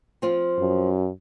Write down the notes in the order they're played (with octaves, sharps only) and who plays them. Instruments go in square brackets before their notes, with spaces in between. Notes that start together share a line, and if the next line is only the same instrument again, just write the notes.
[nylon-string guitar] F3 C4 F4
[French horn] F#2